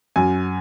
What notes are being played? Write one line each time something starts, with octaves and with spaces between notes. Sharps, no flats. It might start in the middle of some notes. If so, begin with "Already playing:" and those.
F#2 G#5